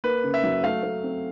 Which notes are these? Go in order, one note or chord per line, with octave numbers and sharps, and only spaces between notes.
A#3 B4
C#3
E5
F#3
A3 F5
A3
C4